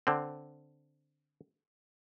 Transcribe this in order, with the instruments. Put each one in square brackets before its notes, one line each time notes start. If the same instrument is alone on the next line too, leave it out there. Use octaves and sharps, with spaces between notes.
[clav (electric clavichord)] D3 C4